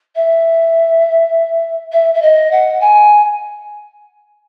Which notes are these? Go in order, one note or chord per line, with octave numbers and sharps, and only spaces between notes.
E5
E5
E5
D#5
F#5
G#5